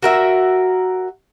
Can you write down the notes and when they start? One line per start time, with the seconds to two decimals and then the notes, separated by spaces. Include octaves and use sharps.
0.03 F#4 A#4 E5